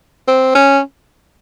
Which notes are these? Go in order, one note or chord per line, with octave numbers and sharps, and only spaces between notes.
C4
C#4